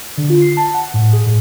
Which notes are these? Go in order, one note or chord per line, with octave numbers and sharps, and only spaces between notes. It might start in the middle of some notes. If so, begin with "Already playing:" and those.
D3
F4
C7
A5
F#5
A2
G#4
A2